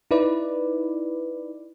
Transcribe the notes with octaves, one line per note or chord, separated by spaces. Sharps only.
D#4 E4 B4 D5